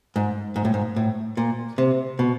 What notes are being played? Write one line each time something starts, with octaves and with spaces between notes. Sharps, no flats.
G#2
G#2
A2
G#2
A2
A#2
C3
B2